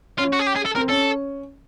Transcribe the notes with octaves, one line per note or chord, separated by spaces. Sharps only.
C#4 F4
F#4
G#4
G4
G#4
A4
C4 A#4
C#4 A4